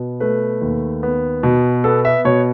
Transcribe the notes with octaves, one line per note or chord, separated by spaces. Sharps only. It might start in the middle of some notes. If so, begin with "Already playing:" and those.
Already playing: B2 B3
A3 B4
D#2
B3
B2
B3 A4
E5
B2 C#5